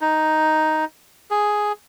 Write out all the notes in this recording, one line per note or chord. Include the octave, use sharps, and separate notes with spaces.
D#4
G#4